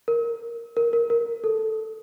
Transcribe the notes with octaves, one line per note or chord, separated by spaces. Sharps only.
A#4
A#4
A#4
A#4
A4